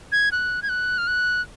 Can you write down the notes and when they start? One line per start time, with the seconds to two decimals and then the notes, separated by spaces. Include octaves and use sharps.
0.12 G#6
0.32 F#6
0.63 G#6
0.69 F#6
0.98 F6
1.07 F#6